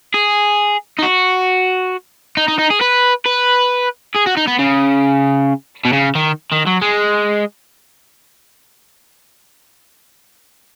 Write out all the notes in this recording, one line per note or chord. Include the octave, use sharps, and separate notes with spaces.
G#4
D#4
F#4
D#4
D#4
D#4
G#4
B4
B4
G#4
F#4
D#4
B3
C#3
B2
C#3
D#3
D#3
F#3
G#3